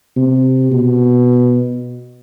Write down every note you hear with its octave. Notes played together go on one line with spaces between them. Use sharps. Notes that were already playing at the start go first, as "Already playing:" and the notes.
C3
B2